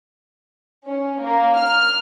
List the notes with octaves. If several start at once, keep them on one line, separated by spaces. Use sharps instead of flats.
C#4
A#3
F6